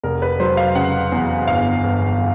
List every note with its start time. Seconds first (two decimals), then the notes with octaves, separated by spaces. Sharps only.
0.03 F1 A#4
0.22 B4
0.39 F#3 C5
0.57 F5
0.75 C#3 F#5
1.12 E2
1.47 G1 F5
1.84 G1